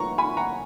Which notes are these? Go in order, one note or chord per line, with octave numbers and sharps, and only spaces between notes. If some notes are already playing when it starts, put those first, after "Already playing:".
Already playing: F#5 A#5 C#6
G#5 B5
F#5 A#5